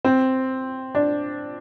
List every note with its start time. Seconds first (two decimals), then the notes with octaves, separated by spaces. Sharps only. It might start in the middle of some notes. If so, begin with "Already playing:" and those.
0.05 C4
0.95 D4